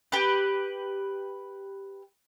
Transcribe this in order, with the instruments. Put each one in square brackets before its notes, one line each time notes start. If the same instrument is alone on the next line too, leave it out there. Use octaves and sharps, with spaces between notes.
[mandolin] G4 B4